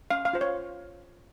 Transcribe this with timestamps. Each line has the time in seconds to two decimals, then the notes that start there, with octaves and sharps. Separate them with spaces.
0.10 C#4 F5
0.25 F5
0.33 F4 C5
0.41 C#5